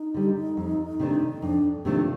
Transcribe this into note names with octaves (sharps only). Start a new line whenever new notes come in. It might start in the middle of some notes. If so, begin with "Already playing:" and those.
Already playing: D#4
D3 G3
F2
C3 D#3 A3 D4
F2 D4
C3 D#3 F3 A3 D4